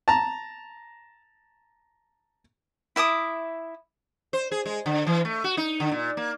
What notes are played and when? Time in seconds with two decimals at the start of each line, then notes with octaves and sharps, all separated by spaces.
0.08 A5 A#5
2.96 E4 E5 D6 D#6
4.33 C5
4.51 G#4
4.66 G#3
4.86 D3
5.07 E3
5.25 A3
5.44 F#4
5.57 D#4
5.80 D3
5.92 A#2
6.17 A#3